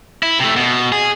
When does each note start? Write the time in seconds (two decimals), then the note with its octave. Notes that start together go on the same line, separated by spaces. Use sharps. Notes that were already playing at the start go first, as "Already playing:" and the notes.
0.23 E4
0.40 C3 A3
0.56 B2
0.92 G#4